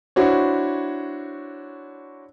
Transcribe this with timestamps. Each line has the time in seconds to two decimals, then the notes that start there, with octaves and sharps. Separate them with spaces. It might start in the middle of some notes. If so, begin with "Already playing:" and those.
0.16 D4 E4 F#4 C5 C#5